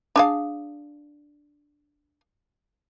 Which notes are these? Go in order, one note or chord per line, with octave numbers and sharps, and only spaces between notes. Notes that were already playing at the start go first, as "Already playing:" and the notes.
D4 G#4 F5